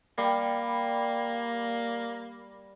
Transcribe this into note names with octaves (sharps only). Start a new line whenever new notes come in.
G3 A#3